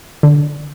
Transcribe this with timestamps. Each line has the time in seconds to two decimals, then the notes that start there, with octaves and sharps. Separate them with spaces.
0.23 D3